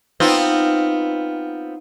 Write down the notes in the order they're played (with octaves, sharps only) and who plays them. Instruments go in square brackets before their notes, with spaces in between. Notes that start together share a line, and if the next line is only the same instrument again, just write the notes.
[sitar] B3 C4 F4 [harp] D#4